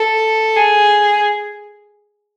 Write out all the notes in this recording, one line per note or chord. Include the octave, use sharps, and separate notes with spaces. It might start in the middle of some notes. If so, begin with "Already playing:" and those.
Already playing: A4
G#4